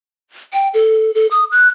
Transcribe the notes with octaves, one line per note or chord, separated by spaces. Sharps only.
G5
A4
A4
D#6
F#6